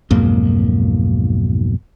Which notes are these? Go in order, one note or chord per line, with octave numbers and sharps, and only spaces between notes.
B1 F2 G#2 A#3